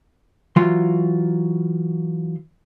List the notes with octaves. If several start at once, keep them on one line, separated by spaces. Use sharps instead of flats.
E3 F#3 F4 C6